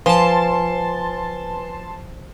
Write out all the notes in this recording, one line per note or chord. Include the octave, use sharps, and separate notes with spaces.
F3 B4 G#5 A5 C6